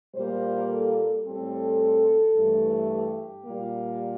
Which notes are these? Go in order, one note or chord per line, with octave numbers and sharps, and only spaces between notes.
A#2 G3 A#3 C5
A4
A2 G3 C4 A4
G2 E3 A3
G4
A#2 G3 A#3